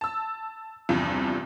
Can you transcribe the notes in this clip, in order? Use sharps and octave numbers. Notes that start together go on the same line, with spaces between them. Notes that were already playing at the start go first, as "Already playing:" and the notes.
A5 E6
E2 G2 C3 F3